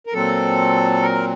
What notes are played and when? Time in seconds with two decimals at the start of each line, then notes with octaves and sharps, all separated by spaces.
0.07 A#4
0.13 A#2 F#3 C4 A4
1.02 A#4